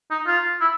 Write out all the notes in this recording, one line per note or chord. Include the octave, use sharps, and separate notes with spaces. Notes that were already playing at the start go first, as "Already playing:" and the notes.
D#4
F4
E4